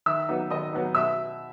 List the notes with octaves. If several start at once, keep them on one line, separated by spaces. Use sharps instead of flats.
D#3 E5 E6
F#3 B3 D#4
D#3 D#5 D#6
F#3 B3 D#4
B2 E5 E6